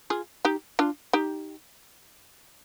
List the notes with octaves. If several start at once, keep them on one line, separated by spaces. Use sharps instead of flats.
F4 G#4
D#4 G4
D4 F4
D#4 G4